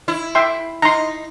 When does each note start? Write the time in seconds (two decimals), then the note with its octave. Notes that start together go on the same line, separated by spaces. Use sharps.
0.08 E4
0.35 E5 G5 C6
0.82 D#4 A#5 C6